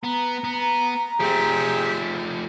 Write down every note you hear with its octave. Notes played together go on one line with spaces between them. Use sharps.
B3 A#5
B3
F3 A3 C4 G4 G#4